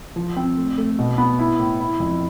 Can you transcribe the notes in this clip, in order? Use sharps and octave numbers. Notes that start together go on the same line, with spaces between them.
F3
C4
A3
A3
B2
B3
E4
A2
E4
F2